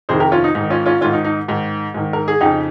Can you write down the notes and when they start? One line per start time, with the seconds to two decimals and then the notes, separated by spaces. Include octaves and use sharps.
0.09 F2 C3 D#3 G#4 C5
0.20 G4 A#4
0.32 C#4 F4
0.44 D#4
0.55 G#2 D#3 D#4
0.70 C#4 F4
0.86 C#4 F4
1.01 G#2 D#3 C#4 F4
1.13 D#4
1.24 D#4
1.48 G#2 D#3
1.94 G#2 D#3
2.13 A#4
2.28 G#4
2.41 F2 C#3 D#4 G4